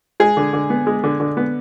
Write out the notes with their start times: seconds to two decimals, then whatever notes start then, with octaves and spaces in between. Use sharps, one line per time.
0.20 G#3 G#4
0.37 D3
0.53 D3
0.70 B3
0.87 G#3
1.04 D3
1.20 D3
1.37 B3